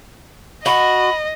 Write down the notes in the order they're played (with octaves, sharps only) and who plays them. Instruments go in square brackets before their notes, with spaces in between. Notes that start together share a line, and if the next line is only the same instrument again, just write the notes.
[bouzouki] F#4 [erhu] D#5 [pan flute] B5